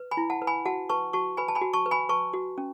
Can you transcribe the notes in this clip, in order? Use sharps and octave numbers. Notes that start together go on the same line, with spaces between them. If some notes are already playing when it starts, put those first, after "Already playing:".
Already playing: B4
G#5 B5
E4
F#5 A5
B4
G#5 B5
F#4 F#5 A5
B4 A5 C#6
F#4 A5 C#6
B4 G#5 B5
A5
G#5 B5
F#4
A5 C#6
B4
G#5 B5
B4 A5 C#6
F#4
C#4